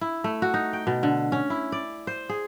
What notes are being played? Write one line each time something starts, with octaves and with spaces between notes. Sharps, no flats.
E4
A3
F#4
D#4
G5
B2
D3
C#4
E4
D5
C5
G#4